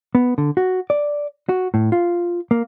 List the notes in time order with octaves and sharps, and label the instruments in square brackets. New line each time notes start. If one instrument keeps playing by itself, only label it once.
[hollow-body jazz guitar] B3
D3
F#4
D5
F#4
A2
F4
A#3